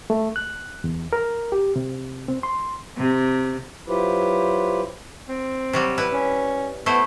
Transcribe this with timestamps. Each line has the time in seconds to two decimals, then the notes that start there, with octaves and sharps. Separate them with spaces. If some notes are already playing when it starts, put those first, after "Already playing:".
0.10 A3
0.36 F#6
0.84 E2
1.13 A#4
1.52 G4
1.76 C3
2.28 C4
2.43 C6
2.97 C3
3.88 F#3 E4 F4 G4 B4 C5
5.29 C4
5.73 C3 F#3 G3
5.98 E4 B4
6.13 C#4
6.86 A3 B3 E4 C5